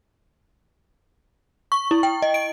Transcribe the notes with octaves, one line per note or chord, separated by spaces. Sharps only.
C#6
E4
G5
D#5
D7